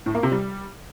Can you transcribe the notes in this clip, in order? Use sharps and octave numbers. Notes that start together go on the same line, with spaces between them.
A2
A#3
C3
G3